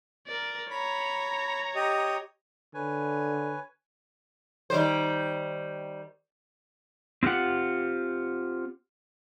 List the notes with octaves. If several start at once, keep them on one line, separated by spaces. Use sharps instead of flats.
A#4 D5
C#5 A#5 B5
G4 D#5
D3 B4 C#5 G#5
D#3 G3 C5
C4 E4 F4 G4 F#5